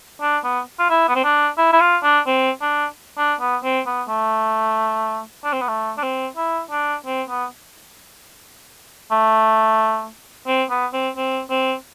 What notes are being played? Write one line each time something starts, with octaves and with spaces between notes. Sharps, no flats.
D4
B3
F4
E4
B3
C4
D4
E4
E4
F4
D4
C4
D4
D4
B3
C4
B3
A3
D4
C4
B3
A3
D4
C4
E4
D4
C4
B3
A3
C4
B3
C4
C4
C4